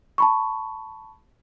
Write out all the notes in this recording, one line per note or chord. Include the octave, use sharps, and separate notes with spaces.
A5 B5 C#6